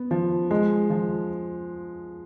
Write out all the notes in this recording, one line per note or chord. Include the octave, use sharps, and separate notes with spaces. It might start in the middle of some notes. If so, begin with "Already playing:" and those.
Already playing: B3
F3
G#3
F3